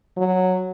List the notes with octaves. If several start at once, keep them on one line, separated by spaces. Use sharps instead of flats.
F#3